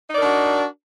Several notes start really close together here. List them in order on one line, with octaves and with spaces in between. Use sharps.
D#4 D5 A#4 D4 F#4